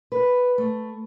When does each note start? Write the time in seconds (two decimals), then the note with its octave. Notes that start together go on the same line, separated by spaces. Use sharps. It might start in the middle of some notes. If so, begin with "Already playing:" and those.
0.12 B4
0.58 A3